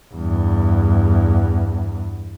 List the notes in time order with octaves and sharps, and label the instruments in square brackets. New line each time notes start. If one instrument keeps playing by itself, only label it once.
[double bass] E2 G2